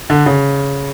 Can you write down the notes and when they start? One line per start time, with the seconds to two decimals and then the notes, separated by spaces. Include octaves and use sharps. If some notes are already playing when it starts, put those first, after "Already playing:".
0.10 D3
0.26 C#3